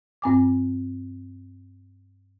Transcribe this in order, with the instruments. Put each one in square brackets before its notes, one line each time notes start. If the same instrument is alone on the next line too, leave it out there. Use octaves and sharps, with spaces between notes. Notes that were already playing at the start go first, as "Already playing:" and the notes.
[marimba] G2 C4 G#5 D6